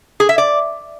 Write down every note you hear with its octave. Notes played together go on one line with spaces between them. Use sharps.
G#4
E5
D5